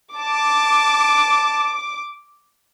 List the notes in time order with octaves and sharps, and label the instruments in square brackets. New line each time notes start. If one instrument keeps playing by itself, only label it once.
[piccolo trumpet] A5 [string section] D6